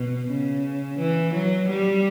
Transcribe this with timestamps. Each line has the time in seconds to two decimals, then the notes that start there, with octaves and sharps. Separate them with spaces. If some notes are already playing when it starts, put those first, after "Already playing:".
Already playing: B2
0.30 C#3
1.00 E3
1.34 F#3
1.69 G3